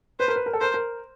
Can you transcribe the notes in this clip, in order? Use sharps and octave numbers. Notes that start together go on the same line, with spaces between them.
B4 C5
A#4
B4
A#4
A4
A#4 C5
A#4